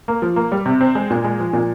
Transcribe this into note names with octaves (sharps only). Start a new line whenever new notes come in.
A#3
F3
A#3
G3
C3
C4
G#3
A#2
G#3
F3
A#2